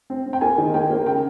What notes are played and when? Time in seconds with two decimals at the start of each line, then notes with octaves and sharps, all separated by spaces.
0.10 C4
0.26 C4
0.33 G5
0.41 A#3 G#5
0.58 D#3
0.74 A#3 G5
0.90 A#3
1.06 C#3 G5